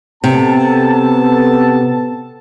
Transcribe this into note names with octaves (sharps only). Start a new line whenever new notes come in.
C3 B3 A4 A5